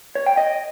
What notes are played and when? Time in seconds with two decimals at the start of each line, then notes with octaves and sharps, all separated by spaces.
0.15 C#5
0.26 G5
0.37 D#5